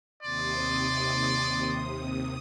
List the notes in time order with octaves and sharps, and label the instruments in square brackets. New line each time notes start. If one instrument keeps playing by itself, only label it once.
[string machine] D#2 C3 D#6 [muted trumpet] D5 [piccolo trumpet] C6